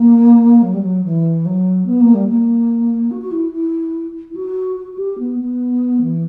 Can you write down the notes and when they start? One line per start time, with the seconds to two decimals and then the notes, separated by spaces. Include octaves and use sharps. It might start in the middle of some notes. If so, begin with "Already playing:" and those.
Already playing: A#3
0.62 F#3
0.74 G3
0.82 F#3
1.04 E3
1.45 F#3
1.86 B3
2.01 A#3
2.14 G3
2.28 A#3
3.11 F#4
3.21 F#4
3.31 E4
3.52 E4
4.30 E4
4.35 F#4
4.76 F#4
4.93 F#4
4.98 G4
5.18 B3
5.40 B3
6.02 E3